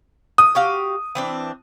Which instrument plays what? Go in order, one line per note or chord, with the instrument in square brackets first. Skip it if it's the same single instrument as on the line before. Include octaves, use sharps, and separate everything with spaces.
[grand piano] D#6
[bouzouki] F#4 G4 F5
E3 C4 D4